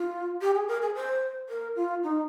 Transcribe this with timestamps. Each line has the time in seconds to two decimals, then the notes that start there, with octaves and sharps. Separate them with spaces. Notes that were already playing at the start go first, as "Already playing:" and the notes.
Already playing: F4
0.41 G4
0.55 G#4
0.68 A#4
0.82 G#4
0.95 C5
1.49 A#4
1.76 F4
2.03 D#4